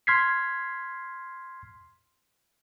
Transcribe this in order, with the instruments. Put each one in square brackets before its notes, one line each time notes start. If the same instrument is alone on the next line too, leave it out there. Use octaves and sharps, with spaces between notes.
[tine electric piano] C6 F6 G#6 B6 C7